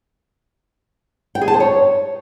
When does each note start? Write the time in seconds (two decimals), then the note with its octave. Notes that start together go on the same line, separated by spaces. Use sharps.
1.35 G5
1.41 G#4
1.48 A5
1.54 C5
1.60 C#5